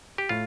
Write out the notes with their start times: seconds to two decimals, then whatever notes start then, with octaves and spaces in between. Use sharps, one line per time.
0.18 G4
0.29 A2 F4